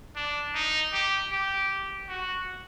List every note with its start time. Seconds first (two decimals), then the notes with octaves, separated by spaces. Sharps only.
0.16 D4
0.55 D#4
0.93 G4
1.31 G4
2.09 F#4